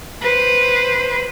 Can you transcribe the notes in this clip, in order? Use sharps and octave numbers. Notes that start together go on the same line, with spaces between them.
B4 C5